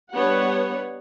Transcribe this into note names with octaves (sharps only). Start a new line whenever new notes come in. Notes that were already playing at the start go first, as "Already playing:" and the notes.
G3 B3 D4 B4 C#5 F#5